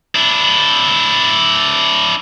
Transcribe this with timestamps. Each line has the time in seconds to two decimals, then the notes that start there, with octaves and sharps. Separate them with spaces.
0.15 D4 E4